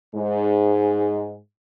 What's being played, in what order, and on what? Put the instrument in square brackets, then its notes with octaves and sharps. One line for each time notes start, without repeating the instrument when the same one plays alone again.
[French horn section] G#2 G#3